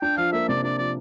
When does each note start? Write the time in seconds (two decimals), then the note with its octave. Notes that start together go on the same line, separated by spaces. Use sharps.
0.02 D4 G5
0.17 F3 F5
0.33 A#3 E5
0.49 C3 D5
0.63 D4 D5
0.78 F3 D5